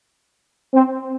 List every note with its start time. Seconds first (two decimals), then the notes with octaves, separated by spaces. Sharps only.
0.73 C4